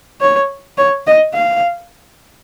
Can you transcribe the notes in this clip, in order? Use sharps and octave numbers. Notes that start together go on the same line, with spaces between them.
C#5
C#5
D#5
F5